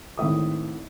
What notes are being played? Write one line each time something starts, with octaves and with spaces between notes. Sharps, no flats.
G#1 A2 E5 D#6